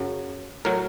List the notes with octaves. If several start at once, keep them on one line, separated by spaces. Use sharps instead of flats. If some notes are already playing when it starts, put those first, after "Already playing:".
Already playing: F#2 C#3 F#3
A2 F#3 A#4